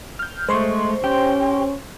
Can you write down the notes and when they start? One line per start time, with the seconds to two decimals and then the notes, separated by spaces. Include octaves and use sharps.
0.19 F6 G6
0.49 G#3 A3 C5 C6 C#6
1.04 C#4 G4